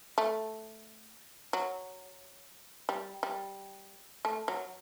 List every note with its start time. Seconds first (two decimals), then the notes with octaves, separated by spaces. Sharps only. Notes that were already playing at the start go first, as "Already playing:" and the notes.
0.18 A3
1.53 F#3
2.89 G3
3.23 G3
4.25 A3
4.48 F#3